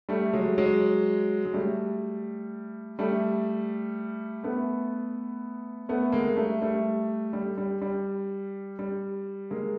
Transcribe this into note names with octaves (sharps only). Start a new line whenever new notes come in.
G3 A3
F#3 G#3
F#3 G#3
G#3
G3 A3
G3 A3
A3 B3
A3 B3
G#3 A#3
G3 A3
G3 A3
G3
G3
G3
G3
G#3 A#3